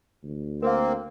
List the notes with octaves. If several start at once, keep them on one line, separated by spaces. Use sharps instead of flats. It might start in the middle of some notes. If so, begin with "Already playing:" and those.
D2
A#3 C4 A#4 F5